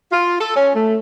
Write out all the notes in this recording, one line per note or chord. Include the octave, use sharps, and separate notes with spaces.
F4
A4
C#4
A3